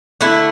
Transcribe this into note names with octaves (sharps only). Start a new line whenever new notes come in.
D3 A3 E4